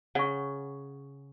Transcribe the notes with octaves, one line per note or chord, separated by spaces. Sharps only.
C#3 F#5 C#6